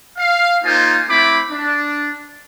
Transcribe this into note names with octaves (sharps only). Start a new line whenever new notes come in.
F5
A#3 D#4 F4 C5 G#5
A3 C4 E4 B5 D6
D4